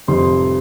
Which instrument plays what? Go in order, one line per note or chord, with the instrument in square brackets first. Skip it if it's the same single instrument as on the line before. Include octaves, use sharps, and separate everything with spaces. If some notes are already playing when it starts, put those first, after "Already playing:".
[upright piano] F1 F2 C3 G3 C4 C6